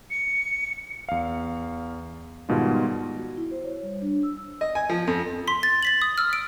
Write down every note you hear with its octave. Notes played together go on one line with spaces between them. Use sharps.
C#7
E2 F5
G#2 B2 D#3 G3 F4
F#4
E4
C5
C#5
G3
D4
E6
D#5
G#5
F3
F2
C6 B6
A6
A6 B6 F#7
D#6
E6 F6
D7